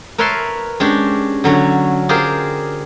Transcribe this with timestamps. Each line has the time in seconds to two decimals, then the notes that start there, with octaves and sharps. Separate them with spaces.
0.18 A#4 B4 C#5 E5 A5 C6
0.80 G#3 C#4 D4 G4
1.44 D3 F#3 C#4
2.09 F4 G4 G#4 A#4 C5